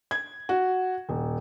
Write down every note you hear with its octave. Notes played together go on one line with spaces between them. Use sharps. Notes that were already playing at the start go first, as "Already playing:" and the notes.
G#6
F#4
D#1